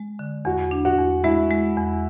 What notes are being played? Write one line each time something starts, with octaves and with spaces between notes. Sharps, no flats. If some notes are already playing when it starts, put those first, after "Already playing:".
Already playing: G#3
D3
E2 F#4
D4
F#4
E2
G#3 E4
G#3
E2